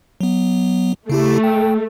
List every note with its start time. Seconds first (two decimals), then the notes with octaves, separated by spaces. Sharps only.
0.21 F#3 B3
1.10 C#3 A3 E4 G4
1.44 G5